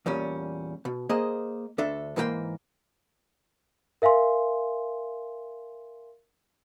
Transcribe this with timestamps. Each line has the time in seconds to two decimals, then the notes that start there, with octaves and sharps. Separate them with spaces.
0.06 E2 A#2 G3 C#4
0.85 B2
1.09 A#3 G#4 C5 D#5
1.78 D2 D4 A4 E5
2.16 G#2 E3 A#3 G#4 G5 C6
4.02 A#4 E5 F5 G#5 C6